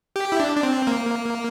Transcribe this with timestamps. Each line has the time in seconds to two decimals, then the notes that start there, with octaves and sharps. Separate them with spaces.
0.16 G4
0.32 E4
0.40 D4
0.56 D4
0.63 C4
0.87 A#3